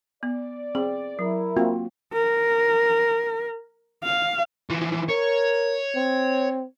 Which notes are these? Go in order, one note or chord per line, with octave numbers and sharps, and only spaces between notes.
B3 D5
C4 G#4
F#3 E4 A#4
A#3 C4 F4 F#4
A#4
F5
E3 F3
A#4 C#5
C4